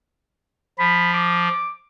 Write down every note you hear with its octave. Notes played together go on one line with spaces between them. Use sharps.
F3 B5
D6